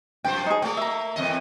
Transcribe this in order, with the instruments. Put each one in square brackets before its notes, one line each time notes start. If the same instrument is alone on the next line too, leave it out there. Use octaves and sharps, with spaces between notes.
[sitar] F#2 F3 C5 [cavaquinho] G5
[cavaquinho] D#4 G#4
[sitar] A3 A#3 [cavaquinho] D5 G5
[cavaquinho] E5 A#5
[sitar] E2 G2 D#5